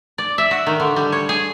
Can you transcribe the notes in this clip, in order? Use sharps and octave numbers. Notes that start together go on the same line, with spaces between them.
D5
E5
F#4
D#3
D3
G3
C#5
G#4